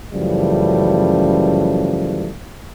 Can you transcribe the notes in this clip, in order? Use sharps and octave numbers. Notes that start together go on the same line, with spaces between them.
F#2 C#3 E3 F3 G3 A3